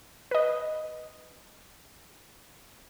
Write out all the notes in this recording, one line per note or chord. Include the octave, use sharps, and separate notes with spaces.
B4 D#5